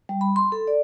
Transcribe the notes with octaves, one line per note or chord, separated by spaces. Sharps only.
G3
B5
C6
A4
D5